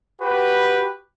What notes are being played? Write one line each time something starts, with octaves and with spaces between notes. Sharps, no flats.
F#4 G4 B4